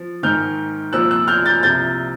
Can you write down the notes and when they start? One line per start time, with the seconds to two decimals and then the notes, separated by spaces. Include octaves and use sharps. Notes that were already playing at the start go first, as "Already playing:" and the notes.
Already playing: F3
0.23 G#2 D#3 F6 G6
0.93 C2 A#2 F3 E6 F#6
1.11 E6 F#6
1.28 F6 G6
1.45 G6 A6
1.63 C2 C3 F3 G6 A6